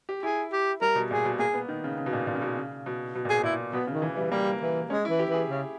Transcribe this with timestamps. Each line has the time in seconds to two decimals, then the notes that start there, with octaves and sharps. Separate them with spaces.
0.09 G4
0.23 E4 G#4
0.52 G4
0.81 G3 A#4
0.95 B2
1.10 A#2 G#4
1.25 B2
1.39 A#3 G#4
1.54 B3
1.69 D#3
1.84 C#3
1.98 C#3
2.06 B2
2.13 A#2
2.27 A#2
2.35 C#3
2.42 B2
2.56 C#3
2.86 B2
3.15 B2
3.25 A#2 G#4
3.43 A#2 E4
3.73 B2 B3
3.87 C#3
3.92 D#3
4.02 E3
4.13 E3 G3
4.31 G3 A#3
4.61 E3
4.90 G#3 C#4
5.05 E4
5.09 E3
5.19 G4
5.29 E3 G#4
5.49 C#3